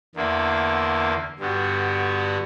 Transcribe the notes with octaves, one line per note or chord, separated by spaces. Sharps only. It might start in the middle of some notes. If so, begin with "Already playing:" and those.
E2 D3 A#3 E4
G2 D3 G3 B3 F#4